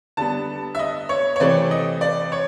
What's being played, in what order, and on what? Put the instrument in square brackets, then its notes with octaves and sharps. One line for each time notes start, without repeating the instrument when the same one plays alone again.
[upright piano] D3 G3 B3 A5
E5
D#5
C#5
C#5
C3 E3 A3 C4 D5
D#5
D5
C#5